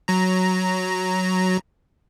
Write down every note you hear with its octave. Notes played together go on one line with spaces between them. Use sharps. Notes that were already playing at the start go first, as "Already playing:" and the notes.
F#3 A#5